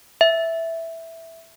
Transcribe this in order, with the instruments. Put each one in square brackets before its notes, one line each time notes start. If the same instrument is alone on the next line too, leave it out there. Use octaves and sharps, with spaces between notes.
[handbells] E5